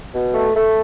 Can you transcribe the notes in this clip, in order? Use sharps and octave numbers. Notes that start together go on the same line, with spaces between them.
B2
A3
A3